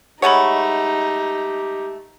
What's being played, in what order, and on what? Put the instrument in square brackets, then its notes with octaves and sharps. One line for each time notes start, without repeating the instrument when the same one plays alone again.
[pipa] G#3 A3 C#5 [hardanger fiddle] D#4 [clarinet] G4 [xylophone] F#5 B5